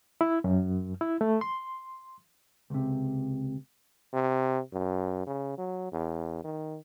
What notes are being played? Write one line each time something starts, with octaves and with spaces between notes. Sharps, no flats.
E4
F#2
E4
A3
C6
C#2 C3
C3
F#2
C#3
F#3
E2
D#3